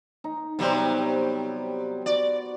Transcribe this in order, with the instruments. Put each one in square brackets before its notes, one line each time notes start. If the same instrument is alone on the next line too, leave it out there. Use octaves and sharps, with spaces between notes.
[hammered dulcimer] D#4
[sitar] C3 F#3 G3 [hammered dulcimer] B3 D#4 C5
[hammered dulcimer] F#4 [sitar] D5